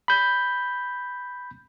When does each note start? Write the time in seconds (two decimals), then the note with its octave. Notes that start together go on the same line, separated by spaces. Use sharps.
0.08 B5 G6